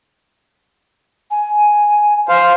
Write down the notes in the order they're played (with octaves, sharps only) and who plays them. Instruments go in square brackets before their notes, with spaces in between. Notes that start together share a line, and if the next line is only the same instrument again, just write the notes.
[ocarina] G#5
[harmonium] C5 F5